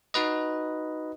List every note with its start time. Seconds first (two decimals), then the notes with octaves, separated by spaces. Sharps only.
0.14 D#4 F#4 B4 D#5